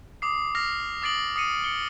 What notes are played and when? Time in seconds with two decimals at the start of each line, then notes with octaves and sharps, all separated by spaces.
0.22 D6 D#6 C7
0.55 F6 A#6 C7 F7
1.02 D6 D#6 A6 C7 D7 F#7
1.36 D#6 C7 C#7 D#7
1.64 C#7 G7